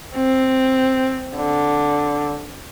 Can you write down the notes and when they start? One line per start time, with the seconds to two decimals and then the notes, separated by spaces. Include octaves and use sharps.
0.15 C4
1.38 D3